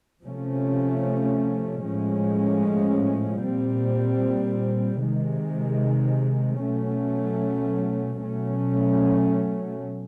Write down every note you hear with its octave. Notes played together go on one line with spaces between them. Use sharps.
C3 F3 A3 C#4
A2 F3 G#3 C#4
A#2 G3 C4
C3 D#3 G#3
B2 F#3 A3 C#4
B2 F#3 A3 C#4